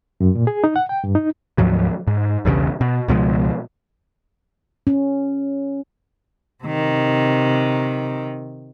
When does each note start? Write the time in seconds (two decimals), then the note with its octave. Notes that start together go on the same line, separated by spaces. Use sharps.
0.20 F#2
0.35 A#2
0.47 G#4
0.64 D#4
0.76 F#5
0.89 G5
1.04 G2
1.15 D#4
1.58 D2 G#2 F3 F#3
2.07 G#2
2.45 B1 E2 G2 C#3
2.81 B2
3.08 C#2 B2 F3 G#3
4.87 C#4
6.64 C3 D#3